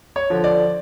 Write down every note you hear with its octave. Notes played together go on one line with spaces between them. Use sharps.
C#5
D3 F3
D5